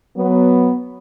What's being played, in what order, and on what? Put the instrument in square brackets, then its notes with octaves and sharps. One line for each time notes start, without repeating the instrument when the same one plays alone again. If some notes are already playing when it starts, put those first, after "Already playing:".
[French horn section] F#3 B3